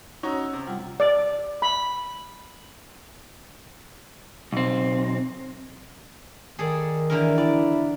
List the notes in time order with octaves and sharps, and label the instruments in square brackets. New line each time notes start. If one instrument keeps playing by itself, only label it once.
[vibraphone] C#4 E6 [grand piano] D#4 F#4 C#5
[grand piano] C3
[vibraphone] G3 F4 F#5
[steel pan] D5
B5
[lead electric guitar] B1 C4
[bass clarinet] D#3 [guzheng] G#4 A4 D5
[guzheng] D3 E3 A#4
[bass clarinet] E4 [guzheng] D5